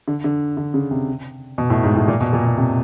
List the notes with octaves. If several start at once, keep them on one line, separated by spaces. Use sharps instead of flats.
D3
D3
D3
C#3
C3
B2
A2
G#2
A2
A#2
B2
A#2
B2
C3